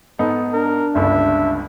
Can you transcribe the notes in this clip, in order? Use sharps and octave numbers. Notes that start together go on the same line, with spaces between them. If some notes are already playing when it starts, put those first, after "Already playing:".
G#2 B3 D#4 A4
D4 A#4
G1 C#2 G2 E5